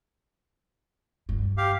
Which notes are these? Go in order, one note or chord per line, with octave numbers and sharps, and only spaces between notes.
G2
G4 F5